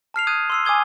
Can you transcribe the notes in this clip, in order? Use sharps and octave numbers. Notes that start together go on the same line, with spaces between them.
A5 F6 C7 F7
D#6 F#6 G#6 D#7
C6 E6 C7
G#5 D6 D#6 G#6 G7